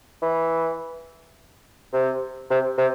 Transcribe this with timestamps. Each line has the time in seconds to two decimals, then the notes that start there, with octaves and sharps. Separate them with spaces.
0.22 E3
1.93 C3
2.50 C3
2.78 C3